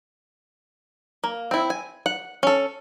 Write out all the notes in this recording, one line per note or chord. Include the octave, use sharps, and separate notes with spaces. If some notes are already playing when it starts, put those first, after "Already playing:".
A#3
C4 E4
G#5
F#5
C#4 A4